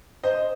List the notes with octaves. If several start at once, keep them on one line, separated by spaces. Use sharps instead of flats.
C5 D#5